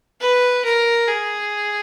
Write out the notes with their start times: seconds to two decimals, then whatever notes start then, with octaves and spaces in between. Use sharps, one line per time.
0.21 B4
0.64 A#4
1.08 G#4